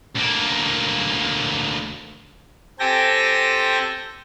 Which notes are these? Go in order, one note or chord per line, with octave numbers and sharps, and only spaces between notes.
D2 A#3
C4 G4 A4 G5 G#5 A#6